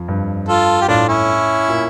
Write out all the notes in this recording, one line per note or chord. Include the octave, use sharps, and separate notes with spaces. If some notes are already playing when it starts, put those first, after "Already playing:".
Already playing: F2
G2
F4 A4
G4
A2 D4 F4
C#4 E4
A#2